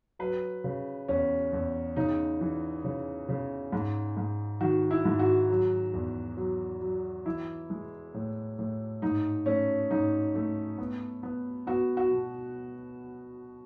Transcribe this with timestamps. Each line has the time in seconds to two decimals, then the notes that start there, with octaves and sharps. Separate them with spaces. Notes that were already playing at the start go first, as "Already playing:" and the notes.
0.19 F#3 B4
0.64 C#3
1.08 E2 C#4
1.53 E2
1.96 C#3 D#4
2.41 E3
2.84 C#3
3.29 C#3
3.72 G#2
4.17 G#2
4.61 D#3 F#4
4.91 E4
5.05 G#2
5.19 F#4
5.50 F#3
5.94 E2
6.37 F#3
6.81 F#3
7.26 E3 E4
7.70 G#3
8.14 A2
8.59 A2
9.02 G#2 D#4
9.46 A3 C#4
9.91 G#2 D#4
10.35 A3
10.78 B3
11.23 B3
11.67 B3 F#4
11.97 F#4
12.11 B2